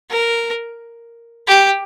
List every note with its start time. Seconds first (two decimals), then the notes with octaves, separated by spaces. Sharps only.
0.11 A#4
1.47 G4